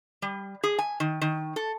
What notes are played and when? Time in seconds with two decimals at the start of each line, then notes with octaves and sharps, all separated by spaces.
0.22 G3
0.63 G#4
0.78 G#5
1.00 D#3
1.21 D#3
1.56 A4